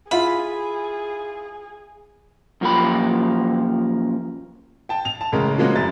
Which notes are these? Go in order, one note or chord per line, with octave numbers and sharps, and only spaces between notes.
E4 F4 G#4 B5
F#2 A#2 F3 A#3 G4 B5
G5 A5
F7
A5
A1 C#3 G#3 A#4
F3 F#3 G#3 A#3 C#4 F#4
F1 F#2 E4 A6